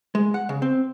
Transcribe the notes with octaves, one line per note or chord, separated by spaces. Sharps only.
G#3
F#5
C#3
C4